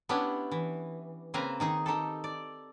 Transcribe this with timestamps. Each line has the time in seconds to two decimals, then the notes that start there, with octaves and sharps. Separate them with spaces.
0.09 B3 C#4 D4 E4 G4
0.51 E3
1.34 C#3 A#3 C4 B4 G#5 A#5
1.60 D#3 D#4 G#4
1.86 D#4 G4 A4
2.24 D5